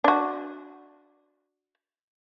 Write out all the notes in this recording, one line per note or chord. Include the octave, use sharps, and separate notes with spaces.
D4 F#4